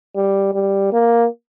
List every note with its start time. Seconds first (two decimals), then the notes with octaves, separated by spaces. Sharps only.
0.16 G3
0.54 G3
0.92 A#3